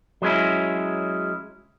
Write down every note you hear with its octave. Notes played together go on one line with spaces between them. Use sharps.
F#3 G#3 C#4 E4